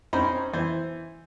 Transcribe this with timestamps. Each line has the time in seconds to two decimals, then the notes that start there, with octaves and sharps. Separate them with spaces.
0.13 C4 C#4 D#4 C5 A#5 B5
0.53 E3 C5